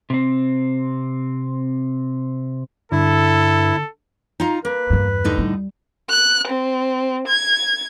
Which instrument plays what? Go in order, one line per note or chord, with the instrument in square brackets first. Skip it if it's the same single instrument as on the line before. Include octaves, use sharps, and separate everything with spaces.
[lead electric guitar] C3 C4
[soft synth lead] G2 [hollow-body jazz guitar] D3 [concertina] E4 [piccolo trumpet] A4
[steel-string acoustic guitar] D#4 F4 A#5
[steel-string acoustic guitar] A#3 [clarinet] B4
[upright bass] E2 G2
[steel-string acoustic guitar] A2 D3 D#4
[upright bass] G3
[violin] F#6
C4
G#6